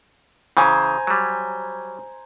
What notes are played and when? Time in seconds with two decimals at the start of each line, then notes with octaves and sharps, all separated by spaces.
0.57 C#3 E3 C5 G#5 A#5
1.07 F#3 G3